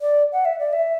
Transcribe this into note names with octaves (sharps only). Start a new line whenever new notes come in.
D5
F#5
E5
D5
E5